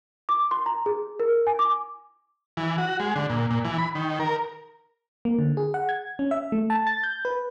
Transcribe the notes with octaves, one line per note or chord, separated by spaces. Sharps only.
D6
C6
A#5
G#4
A#4
G#5
D6
E3
F#4
G#3
D3
A#2
A#2
E3
B5
D#3
A#4
A#3
D3
G#4
F#5
G#6
C#4
E5
A3
A5
A6
G6
B4